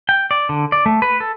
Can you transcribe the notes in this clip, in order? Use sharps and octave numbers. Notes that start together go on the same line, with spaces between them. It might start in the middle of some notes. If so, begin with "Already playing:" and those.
G5
D5
D3
D5
A3
B4
A4